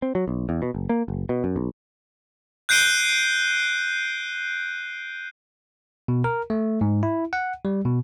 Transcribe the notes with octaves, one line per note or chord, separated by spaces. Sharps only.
C4
F#3
B1
E2
B2
F#1
A#3
F#1
B2
F#2
B1
F#6 G6 C7 D7 D#7 G7
B2
A#4
A3
G#2
E4
F#5
G3
B2